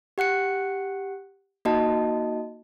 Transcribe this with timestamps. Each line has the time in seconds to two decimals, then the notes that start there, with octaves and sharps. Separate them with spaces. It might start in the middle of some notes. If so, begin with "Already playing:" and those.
0.18 G4 F#5 F#6 C#7
1.65 A#3 D#4 F#4 D#5 A5